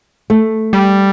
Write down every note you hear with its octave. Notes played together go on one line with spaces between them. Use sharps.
A3
G3